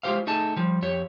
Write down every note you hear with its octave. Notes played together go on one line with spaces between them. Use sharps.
G#3 E4 F4 G4 C5 F5
A3 D#4 G#4 A5
F3 G3
F2 G4 C#5